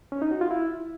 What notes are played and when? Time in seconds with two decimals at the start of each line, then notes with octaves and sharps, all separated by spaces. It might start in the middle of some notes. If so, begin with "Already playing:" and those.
0.12 C#4
0.22 D#4
0.31 F#4
0.41 F4
0.51 E4